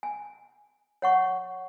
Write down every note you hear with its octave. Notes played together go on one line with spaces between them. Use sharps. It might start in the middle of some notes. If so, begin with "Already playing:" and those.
G#5
C#5 F#5 C#6